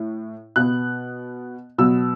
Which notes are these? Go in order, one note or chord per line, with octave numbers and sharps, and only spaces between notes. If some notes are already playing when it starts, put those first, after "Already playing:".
Already playing: A2
B2 B3 F#6
B2 F#3 B3 E6